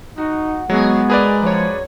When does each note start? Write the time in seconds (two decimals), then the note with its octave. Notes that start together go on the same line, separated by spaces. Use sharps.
0.18 D#4 F#4
0.70 F#3 G#3 B3 F#4 G#4
1.10 G#4 A#4 B4 D5
1.42 F#2 F3 C#5